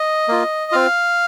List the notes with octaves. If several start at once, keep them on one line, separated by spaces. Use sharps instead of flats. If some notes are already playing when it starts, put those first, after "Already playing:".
Already playing: D#5
A#3 F4
C4 F4 F5